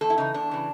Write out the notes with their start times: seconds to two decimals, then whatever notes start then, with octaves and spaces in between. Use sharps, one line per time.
0.01 E2 A4
0.10 E4
0.18 C#3 E3 D#4
0.34 E2 D4
0.51 C#3 E3